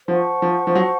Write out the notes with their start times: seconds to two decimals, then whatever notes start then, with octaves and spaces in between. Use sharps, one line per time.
0.08 F3 C5 F#5 A5 C#6
0.42 F3
0.67 F3
0.75 F#3